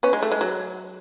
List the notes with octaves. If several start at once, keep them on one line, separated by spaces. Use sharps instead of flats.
B3 C#4
G#3
A3
G#3
F#3